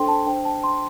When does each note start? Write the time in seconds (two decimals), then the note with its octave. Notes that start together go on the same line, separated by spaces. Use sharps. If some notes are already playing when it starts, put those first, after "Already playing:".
Already playing: D4 A4 C5 G5 C6
0.08 A5
0.26 D4 C5 G5
0.45 A5
0.64 C6